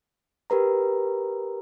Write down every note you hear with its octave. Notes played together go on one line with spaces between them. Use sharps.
G4 A#4 B4 A#5